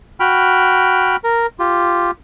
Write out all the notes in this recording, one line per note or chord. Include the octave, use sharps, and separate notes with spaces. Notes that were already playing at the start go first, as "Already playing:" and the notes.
F#4 G5 B5 F6
A#4
F4 G4